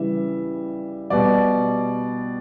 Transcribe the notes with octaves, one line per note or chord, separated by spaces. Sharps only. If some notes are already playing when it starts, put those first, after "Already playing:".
Already playing: C#3 E3 G3 E5
B2 G3 D5